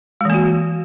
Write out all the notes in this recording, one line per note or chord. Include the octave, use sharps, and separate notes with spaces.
E3 G#3 A#3 F#4